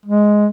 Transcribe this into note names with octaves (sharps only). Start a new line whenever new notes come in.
G#3